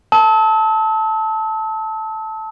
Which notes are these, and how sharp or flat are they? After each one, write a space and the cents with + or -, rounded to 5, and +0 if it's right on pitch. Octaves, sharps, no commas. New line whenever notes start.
A5 +0 E6 -40